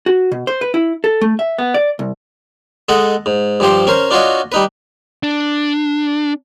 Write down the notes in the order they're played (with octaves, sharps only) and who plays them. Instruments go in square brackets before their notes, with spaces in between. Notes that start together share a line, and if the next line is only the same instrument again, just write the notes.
[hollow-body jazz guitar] F#4
B2
C5
B4
E4
A4
A3
E5
B3
D5
C2
[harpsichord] G#3 A4 D#5 F#5
G#2
G2 F3 G4 C5
C#4 A#4 C5
D4 F4 F#4 C#5 D#5
G3 D#4 B4
[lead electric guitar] D4